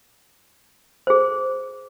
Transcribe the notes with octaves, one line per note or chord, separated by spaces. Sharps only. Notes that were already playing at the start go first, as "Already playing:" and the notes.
G#4 C5